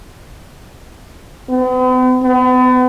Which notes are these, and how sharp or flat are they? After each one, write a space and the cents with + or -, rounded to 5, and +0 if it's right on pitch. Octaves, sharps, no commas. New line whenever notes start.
B3 +45
B3 +40